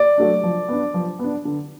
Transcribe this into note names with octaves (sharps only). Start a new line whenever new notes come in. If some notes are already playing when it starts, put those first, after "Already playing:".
Already playing: D5
F#3 A3 D4
F3
B3 D4
F3
B3 D4
D3